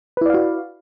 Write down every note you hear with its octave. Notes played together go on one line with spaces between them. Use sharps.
E4 F#4 B4 D5 F5